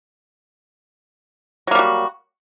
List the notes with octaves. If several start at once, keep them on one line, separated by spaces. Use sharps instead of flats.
F#3 G3 A#3 F#4